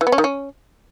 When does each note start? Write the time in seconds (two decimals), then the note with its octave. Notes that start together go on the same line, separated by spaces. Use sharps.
0.01 E3
0.07 B3
0.12 C#4
0.18 D#3
0.24 C#4